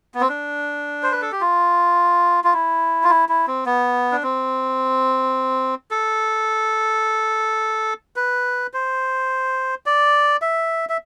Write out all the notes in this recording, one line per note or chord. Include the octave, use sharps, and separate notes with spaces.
B3
C4
D4
C5
B4
A4
G4
F4
F4
E4
F4
E4
E4
C4
B3
D4
C4
A4
B4
C5
D5
E5
E5